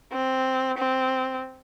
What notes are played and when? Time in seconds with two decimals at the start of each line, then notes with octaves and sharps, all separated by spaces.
0.12 C4
0.78 C4